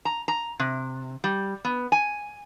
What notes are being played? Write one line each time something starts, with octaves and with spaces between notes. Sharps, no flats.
A#5
A#5
C3
G3
B3
G#5